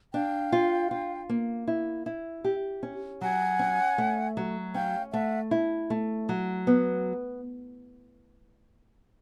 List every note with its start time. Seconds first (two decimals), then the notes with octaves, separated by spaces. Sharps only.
0.13 D4 F5 G5
0.52 F4
0.91 F4
1.29 A#3
1.67 E4
2.06 E4
2.44 G4
2.83 C#4
3.21 F#3 F#5 G#5
3.59 C#4
3.98 A3
4.37 F#3
4.74 C#4 F5 G5
5.13 A3 E5 F#5
5.51 E4
5.90 A3
6.29 F#3
6.67 B3